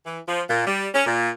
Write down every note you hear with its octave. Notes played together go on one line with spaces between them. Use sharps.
E3
F3
A#2
G3
C#4
A#2